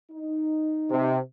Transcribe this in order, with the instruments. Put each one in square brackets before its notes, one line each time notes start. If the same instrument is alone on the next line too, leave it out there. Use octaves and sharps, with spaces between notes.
[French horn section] D#4
[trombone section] C3